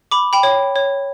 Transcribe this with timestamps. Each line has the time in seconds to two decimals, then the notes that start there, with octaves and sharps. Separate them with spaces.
0.11 B5 D6
0.33 G5 B5
0.43 C#5
0.76 C#5